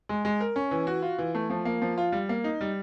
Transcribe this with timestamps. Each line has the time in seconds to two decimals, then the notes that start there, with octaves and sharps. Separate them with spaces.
0.09 G#3
0.25 G#3
0.40 A#4
0.56 C#4
0.71 E3
0.87 F#4
1.02 F4
1.18 E3
1.35 A3
1.50 F3
1.65 A#3
1.82 F3
1.98 F4
2.12 G3
2.29 A#3
2.44 D#4
2.61 G3